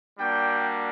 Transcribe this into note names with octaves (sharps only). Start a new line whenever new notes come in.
G3 A#3 D4 F#4 G5